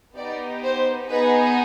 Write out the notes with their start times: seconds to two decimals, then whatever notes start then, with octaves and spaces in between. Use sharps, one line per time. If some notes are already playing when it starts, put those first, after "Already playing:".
0.16 B3 D#4 G4 D5
0.63 C5
1.09 B3 D#4 G#4 B4